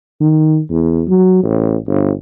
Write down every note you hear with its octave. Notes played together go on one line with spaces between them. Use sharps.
D#3
E2
F#3
A1
G1